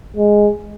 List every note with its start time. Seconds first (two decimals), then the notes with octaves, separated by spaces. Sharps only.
0.17 G#3